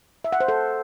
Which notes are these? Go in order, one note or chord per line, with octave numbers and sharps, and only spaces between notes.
E5
F#5
C5
A4